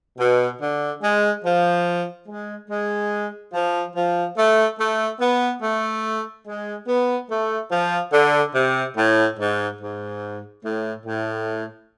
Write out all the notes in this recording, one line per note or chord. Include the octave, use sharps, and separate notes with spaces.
B2
D3
G#3
F3
G#3
G#3
F3
F3
A3
A3
B3
A3
G#3
B3
A3
F3
D3
C3
A2
G#2
G#2
A2
A2